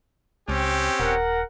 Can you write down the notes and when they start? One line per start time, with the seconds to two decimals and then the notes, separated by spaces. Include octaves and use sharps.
0.49 C#2 C4 C#4 G4
1.00 D#1 A#4 F#5